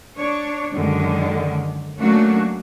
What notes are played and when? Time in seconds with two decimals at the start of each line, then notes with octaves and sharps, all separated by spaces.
0.16 D4 C#5
0.73 F#2 D3 D#3 G#3
1.99 F#3 A3 A#3 C#4 D4 F#4